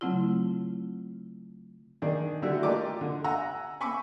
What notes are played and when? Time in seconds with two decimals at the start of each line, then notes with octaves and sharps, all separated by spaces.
0.01 C#3 F#3 A3 C4 E4 F4
2.02 D#3 D4 G#4
2.42 D3 G3 A3 E4 F#4 G4
2.63 F4 G4 A#4 D5 D#5 D6
3.01 D3
3.24 F#5 G#5 A#5 E6
3.81 G#5 B5 C#6 D6 E6